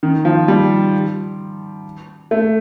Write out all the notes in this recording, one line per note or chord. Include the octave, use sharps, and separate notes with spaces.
D#3
F3
G3
A3